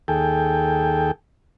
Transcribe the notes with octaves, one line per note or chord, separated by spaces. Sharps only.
D#2 G#4 A4 G5